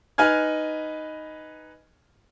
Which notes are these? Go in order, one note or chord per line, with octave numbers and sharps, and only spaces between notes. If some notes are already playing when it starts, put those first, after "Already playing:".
D#4 B4 G#5 F6 G#6